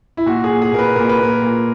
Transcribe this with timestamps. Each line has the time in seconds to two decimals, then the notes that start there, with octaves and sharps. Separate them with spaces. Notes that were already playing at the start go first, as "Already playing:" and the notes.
0.17 E4
0.26 A#2 F#4
0.44 G#4
0.50 A#2
0.62 G#4
0.72 A#2 A#4
0.79 B4
0.96 A#2 A#4
1.09 B4
1.19 A#2 A#4
1.42 A#2